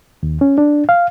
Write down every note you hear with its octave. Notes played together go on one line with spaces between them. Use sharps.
D#2
C#4
D4
F5